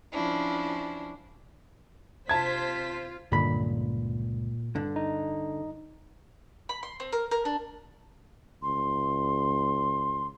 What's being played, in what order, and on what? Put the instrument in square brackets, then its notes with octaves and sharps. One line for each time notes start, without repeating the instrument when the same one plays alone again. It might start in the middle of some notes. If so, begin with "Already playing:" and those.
[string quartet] F3 C#4 D4 E4
[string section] C3 C5 B6 [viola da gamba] F4 [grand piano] A5 G#6
[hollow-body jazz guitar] C#2 B5 [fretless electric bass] G2 D3 D#3 [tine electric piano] A#2
[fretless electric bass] G2 [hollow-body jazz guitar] D3
[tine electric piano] D#4
[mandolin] B5
C6
C4
A#4
A#4
D4
[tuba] C#2 [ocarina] C6